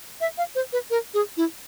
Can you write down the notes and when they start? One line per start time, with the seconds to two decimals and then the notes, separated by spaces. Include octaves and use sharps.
0.21 E5
0.38 F5
0.55 C5
0.73 B4
0.90 A#4
1.14 G#4
1.37 E4